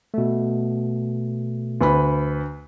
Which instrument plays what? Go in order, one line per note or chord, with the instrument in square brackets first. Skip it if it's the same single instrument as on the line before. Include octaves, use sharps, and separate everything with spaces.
[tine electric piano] B2 A3
[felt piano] D2 B4 B5